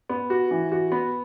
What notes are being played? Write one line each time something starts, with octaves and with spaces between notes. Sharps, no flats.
B3
F#4
E3
F#4
B3